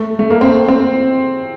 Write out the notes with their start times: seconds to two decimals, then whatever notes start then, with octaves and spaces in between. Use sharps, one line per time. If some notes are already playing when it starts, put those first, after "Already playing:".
Already playing: A3
0.19 A3
0.30 A#3
0.41 C4
0.68 C4